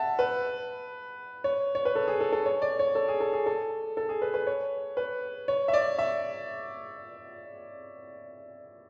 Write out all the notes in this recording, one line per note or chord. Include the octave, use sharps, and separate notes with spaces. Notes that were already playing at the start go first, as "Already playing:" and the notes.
Already playing: E5 F#5 A5
B4
C#5
C#5
B4
A4
G#4
A4
A4
C#5
D5
C#5
A4
G#4
A4
G#4
A4
A4
G#4
B4
B4
C#5
B4
C#5
E5
D5
E5